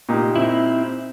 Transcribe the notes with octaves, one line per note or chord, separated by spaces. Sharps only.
A#2 D#4 G4
C4 E4